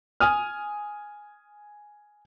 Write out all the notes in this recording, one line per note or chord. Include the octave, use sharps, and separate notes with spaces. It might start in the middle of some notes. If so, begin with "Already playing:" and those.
G#5 D#6 F6